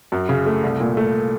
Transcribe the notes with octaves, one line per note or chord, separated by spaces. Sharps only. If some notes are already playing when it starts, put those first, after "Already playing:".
F#2
C#3
A3
C2
A#2
A3